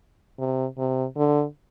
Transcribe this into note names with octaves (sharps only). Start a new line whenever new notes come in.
C3
C3
D3